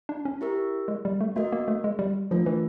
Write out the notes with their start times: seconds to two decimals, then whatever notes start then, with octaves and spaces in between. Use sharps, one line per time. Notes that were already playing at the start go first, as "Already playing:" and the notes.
0.09 D4
0.25 C#4
0.41 E4 G4 A#4
0.88 G#3
1.05 G3
1.21 A3
1.36 A3 F#4 A#4 D#5
1.52 A#3
1.68 A3
1.84 G#3
1.99 G3
2.31 F3 A3 D4 F4 A#4
2.46 E3